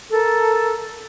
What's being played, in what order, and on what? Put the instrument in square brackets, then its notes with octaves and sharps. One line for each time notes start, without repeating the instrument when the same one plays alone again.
[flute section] A4 A#4